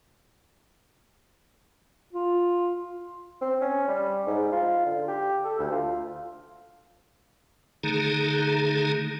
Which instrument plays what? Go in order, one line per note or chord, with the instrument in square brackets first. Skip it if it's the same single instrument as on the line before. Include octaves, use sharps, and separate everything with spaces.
[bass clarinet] F4
[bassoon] C4
C#4
G3
G#2
F4
D3
G4
A4
D2
F4
[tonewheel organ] D3 D#3 A3 D#4 G#4 A#5